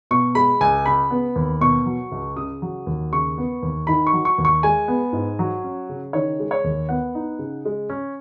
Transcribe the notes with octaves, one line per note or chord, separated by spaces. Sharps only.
B2 C#6
G#3 B5
C#2 G#5
C#3 B5
B3
D#2
B2 C#6
F#3
C#2
C#3 D#6
F#3
D#2
C#3 C#6
B3
D#2
D#3 B5
C#6
F#3
C#6
D#2
C#6
G#3 G#5
B3
G#2
F#3
C#4
C#3
D#3 C#5
G#3
C#5
D#2
B3 F#5
D#4
C#3
G#3
C#4